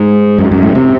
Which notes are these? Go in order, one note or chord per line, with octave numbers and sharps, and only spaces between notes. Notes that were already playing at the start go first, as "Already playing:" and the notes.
Already playing: G#2
F#2
F#2
G#2
A2
C3